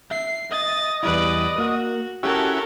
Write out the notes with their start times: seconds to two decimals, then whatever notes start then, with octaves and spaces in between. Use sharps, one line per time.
0.11 E5 C7
0.52 D#5 A6
1.03 E2 G3 E4 B4 D5
1.58 A#3 F#4
2.23 C#4 E4 F#4 G4 A4 A#4